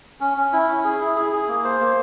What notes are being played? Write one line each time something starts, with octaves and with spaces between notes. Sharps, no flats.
C#4
C#4
E4
C#4
G#4
E4
G#4
G#4
A#3
C5
A#3